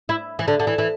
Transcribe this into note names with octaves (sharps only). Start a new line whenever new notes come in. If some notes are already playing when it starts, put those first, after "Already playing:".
E4
E3
D3
D3
E3
E3